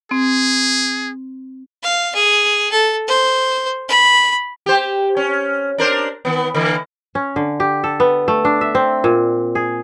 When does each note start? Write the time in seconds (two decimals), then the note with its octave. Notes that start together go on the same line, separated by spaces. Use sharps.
0.11 C4 G#4
1.83 F5
2.15 G#4
2.72 A4
3.08 C5
3.89 B5
4.66 G4 C5
5.17 C#4
5.78 D4 A#4 C5
6.25 D#3 B3
6.55 D3 E3 A#3
7.15 C#4
7.36 D3
7.60 G4
7.84 A4
8.00 B3
8.28 A3
8.45 D4
8.61 E5
8.75 C4
9.04 A#2
9.55 G#4